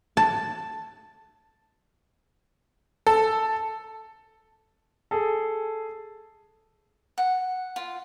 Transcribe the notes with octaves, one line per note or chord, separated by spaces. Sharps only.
A5
A4
G#4 A4
F#5
F4